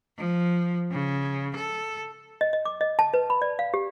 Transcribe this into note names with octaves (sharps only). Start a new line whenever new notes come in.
F3
C#3
A4
D#5
D#5
D6
D#5
A5
B4
B5
D5
F5
G4